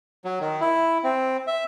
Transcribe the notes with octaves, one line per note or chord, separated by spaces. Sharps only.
F#3
D#3
E4
C4
E5